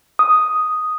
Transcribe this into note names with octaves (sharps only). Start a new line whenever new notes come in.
D#6